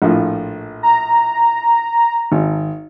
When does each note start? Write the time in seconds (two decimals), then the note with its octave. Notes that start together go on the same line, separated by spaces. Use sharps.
0.02 A#1 A2 F4
0.83 A#5
2.32 G#1